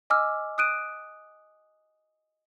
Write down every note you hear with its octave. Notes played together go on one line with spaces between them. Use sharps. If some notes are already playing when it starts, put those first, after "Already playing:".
D#5 G#5 D6 E6 F6
D#6 F#6 D7 D#7